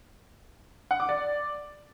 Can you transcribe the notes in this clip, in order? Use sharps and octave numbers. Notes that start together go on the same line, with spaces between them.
F#5
D6
D5